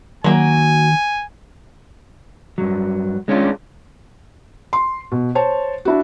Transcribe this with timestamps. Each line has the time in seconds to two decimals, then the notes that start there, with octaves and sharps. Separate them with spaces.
0.24 D#3 F#3 A#3 G#5
2.58 G2 F#3
3.28 G#3 C#4 D4 F4
4.73 C6
5.12 B2
5.35 C5 C#5 A5
5.85 D4 E4 F#4